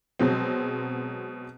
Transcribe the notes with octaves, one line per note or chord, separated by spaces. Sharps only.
B2 F#3 G#3 C4